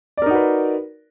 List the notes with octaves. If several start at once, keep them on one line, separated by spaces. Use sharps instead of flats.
D#4 F#4 A#4 B4 D5